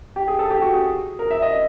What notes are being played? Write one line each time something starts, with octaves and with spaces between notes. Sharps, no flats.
G4
G#4
A4
G4
F#4
G#4
A#4
E5
D#5